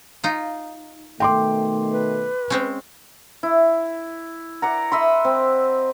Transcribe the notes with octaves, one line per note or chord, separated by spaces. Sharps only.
D#4 F4
B2 D#3 A3 G5 C6 D6
B4
G#3 C4 C#4
E4
D5 F#5 A#5
D#5 E5 B5 C6
C4